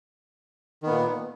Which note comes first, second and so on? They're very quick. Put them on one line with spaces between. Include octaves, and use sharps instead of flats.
D#3 B3 A#2